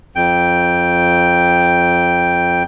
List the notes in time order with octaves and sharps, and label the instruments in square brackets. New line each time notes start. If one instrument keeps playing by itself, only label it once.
[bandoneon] F2 G5